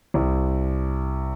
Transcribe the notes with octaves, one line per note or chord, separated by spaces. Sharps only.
C2